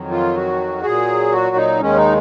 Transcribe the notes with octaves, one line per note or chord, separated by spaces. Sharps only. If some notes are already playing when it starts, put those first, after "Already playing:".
Already playing: F2 D#3 F#3
F4
F#4
A#2 F#3 G#4
F#4
D#4
D#2 D#3 G#3 C#4
D#4